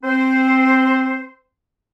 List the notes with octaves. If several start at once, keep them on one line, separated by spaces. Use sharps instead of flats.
C4 C5